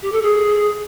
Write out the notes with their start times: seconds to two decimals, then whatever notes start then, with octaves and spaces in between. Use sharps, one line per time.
0.02 G4
0.12 A4
0.22 G#4